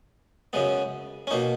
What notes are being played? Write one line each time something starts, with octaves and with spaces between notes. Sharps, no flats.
F#2 C#3 G#3 B3
C#4
B2 A#3 D#4